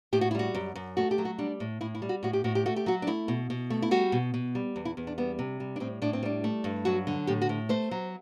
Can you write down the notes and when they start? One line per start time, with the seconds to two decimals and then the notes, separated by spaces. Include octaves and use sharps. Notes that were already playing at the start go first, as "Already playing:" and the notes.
0.13 A2 G4
0.21 F#4
0.31 E4
0.35 G3 F#4
0.54 F#2
0.75 F#2
0.97 A3 F#4
1.11 G4
1.18 F#3
1.25 F#4
1.38 G3 D4
1.60 A2
1.81 A2 E4
1.95 E4
2.02 G3
2.09 F#4
2.23 A2 F#4
2.33 G4
2.44 A2 F#4
2.55 G4
2.66 A3 F#4
2.76 G4
2.86 F#3 F#4
3.02 D4
3.07 A3 E4
3.28 B2
3.50 B2
3.70 A3
3.82 E4
3.91 G3 F#4
4.12 B2
4.34 B2
4.55 G3
4.76 E2
4.85 E4
4.97 E2
5.07 D4
5.18 G3 B3
5.39 C3
5.60 G3
5.76 D4
5.80 A2 C4
6.02 A2 D4
6.13 C4
6.23 G3 D4
6.44 A3
6.64 G2
6.85 F#3 F#4
7.07 D3
7.27 A2 G4
7.42 F#4
7.49 A2
7.69 A3 C5
7.91 F#3